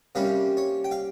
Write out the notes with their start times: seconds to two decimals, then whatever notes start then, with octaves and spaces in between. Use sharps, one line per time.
0.15 C3 G3 A#3 C#4 F5
0.57 C#5
0.84 G5
0.91 F5